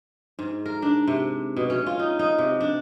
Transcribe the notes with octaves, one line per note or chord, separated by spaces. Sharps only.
G#2
A#4
D4
C3
B2
C#4
F4
D#4
D#4
C3
D4